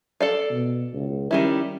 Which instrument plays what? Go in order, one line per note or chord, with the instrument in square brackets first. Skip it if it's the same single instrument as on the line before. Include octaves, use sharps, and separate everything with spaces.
[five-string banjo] A4 D5 F5
[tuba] B2
C#2
[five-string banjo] D#3 G3 E4 [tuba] C#4